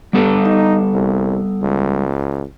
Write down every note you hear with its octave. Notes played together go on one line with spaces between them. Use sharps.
G2 G3 B3 A4
D#4
C2
C#2